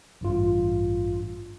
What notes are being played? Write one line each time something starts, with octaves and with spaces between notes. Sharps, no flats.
A1 G2 F4